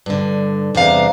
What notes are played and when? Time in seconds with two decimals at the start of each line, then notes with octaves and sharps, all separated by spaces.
0.06 G2 D3
0.75 E2 G2 C3 D4 F5 A#5